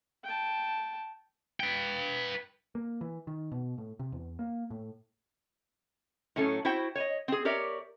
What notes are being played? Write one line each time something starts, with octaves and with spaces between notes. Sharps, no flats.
G5 A5
B4 G5
A#3
E3
D#3
B2
A2
C3
E2
A#3
A2
A2 F#3 C#4 A4
E4 F#4 C5 G5
C#5 D#5
C4 G#4
G4 A#4 C#5 D5 E5